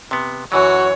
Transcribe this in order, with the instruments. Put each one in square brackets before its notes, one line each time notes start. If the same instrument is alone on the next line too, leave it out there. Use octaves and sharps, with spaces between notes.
[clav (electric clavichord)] C3 B3
[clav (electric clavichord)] F#2 E3 F#3 [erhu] F#4 [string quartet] C#5